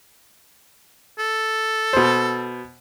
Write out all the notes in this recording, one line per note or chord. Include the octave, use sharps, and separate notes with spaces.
A4
B2 C5